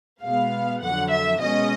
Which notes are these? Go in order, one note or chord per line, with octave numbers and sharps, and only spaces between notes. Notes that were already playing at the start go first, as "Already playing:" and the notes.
B2 G#3 B3 F5
F2 D3 F#3 F#5
E5
B2 G#3 C#4 D#5